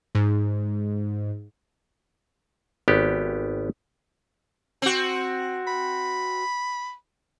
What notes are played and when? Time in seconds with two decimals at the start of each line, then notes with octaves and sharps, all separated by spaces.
0.15 G#2
2.88 G#1 B3 G4
4.82 C4 F#4
5.67 B5